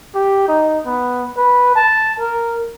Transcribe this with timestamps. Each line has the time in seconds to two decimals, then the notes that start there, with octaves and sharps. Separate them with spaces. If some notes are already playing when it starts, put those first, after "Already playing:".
0.15 G4
0.48 D#4
0.86 B3
1.37 B4
1.76 A5
2.20 A#4